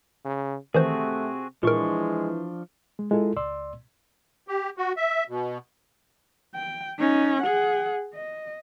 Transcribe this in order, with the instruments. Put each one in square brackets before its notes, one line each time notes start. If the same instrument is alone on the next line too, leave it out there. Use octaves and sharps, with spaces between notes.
[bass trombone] C#3
[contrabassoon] C3 [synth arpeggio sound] D#3 E3 C5 [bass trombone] A3 [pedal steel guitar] C4 F#4 G#4
[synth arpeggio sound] A#2 A#4 [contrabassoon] E3 [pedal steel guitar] F3 D4 C#6 [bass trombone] G#3
[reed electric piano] G#3
G#3 E4 F4 A4
C#2 D5 C6 E6
[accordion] G4
F#4
E5
B2
[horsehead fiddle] G5
C#4 D#4
G#4 F#5
D#5